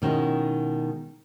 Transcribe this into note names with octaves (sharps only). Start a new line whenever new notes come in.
B2 D#3 G#3 C#4 E4